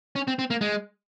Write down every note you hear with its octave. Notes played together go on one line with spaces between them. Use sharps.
C#4
C4
C4
A#3
G#3